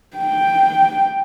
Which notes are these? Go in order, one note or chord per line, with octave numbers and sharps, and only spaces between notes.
G5